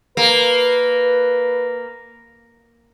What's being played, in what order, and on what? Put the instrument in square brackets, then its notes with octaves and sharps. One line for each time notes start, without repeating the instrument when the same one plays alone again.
[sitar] A#3 [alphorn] B4